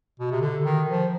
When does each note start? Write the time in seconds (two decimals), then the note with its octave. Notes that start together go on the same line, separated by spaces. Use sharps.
0.20 B2
0.31 C3
0.41 D3
0.65 D#3
0.89 F3